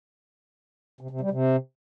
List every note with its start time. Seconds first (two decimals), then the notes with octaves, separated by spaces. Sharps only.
1.01 C3
1.11 C3
1.21 G3
1.31 C3